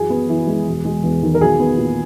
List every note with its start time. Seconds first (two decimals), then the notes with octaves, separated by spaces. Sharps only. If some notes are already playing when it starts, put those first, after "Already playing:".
Already playing: F#2 E3 G#4
0.10 B3
0.29 E3
0.47 G#3
0.67 E1
0.85 G#3
1.03 E2
1.23 D#3
1.35 A#4
1.41 B1 G#4
1.60 B3
1.78 A#2